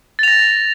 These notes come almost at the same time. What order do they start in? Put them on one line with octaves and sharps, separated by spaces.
A6 F7 A#6